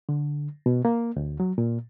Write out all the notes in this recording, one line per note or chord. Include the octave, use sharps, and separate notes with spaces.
D3
B2
A#3
D2
F#3
A#2